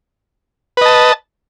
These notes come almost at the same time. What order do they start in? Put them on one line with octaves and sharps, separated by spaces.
B4 D#5 A5